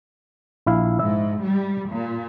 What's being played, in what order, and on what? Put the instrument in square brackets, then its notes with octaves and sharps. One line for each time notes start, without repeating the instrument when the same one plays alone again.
[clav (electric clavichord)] A#1 E4 F5
[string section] G#2 [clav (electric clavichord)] E5
[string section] G3
A#2